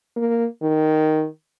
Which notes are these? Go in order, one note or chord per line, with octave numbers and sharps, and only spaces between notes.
A#3
D#3